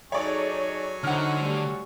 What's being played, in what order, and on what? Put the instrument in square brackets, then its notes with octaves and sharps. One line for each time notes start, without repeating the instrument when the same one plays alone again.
[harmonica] F#3 G#5 C#6 [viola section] D#4 G#4 A4 [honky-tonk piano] C#5 D5
[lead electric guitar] D3 [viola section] D#4 E4 C5 [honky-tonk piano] F#5 F6
[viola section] G3 A3